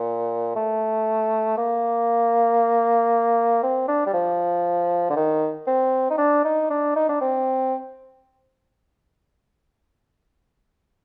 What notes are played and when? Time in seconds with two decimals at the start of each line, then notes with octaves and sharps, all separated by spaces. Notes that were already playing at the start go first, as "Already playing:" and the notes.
Already playing: A#2
0.55 A3
1.57 A#3
3.63 C4
3.88 D4
4.06 G3
4.14 F3
5.10 D3
5.16 D#3
5.67 C4
6.10 D#4
6.18 D4
6.45 D#4
6.70 D4
6.96 D#4
7.09 D4
7.21 C4